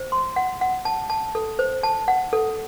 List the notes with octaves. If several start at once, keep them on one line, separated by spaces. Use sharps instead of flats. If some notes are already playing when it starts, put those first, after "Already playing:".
Already playing: C5
C6
F#5
F#5
A5
A5
A4
C5
A5
F#5
A4